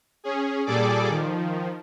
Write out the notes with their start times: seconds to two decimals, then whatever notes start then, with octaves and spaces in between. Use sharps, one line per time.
0.24 C#4 G#4
0.66 A#2 G3 G#4 A4 D5 D6
1.09 D#3 F3